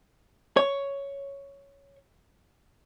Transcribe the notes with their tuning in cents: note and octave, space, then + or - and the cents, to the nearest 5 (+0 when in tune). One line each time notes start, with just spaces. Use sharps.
C#5 +5